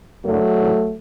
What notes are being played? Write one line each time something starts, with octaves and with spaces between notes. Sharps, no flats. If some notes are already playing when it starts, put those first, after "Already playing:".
F#1 F#2 D3 F#3 A3
G#1 G#2 E3